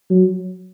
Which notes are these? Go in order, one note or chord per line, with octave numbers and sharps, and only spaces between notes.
F#3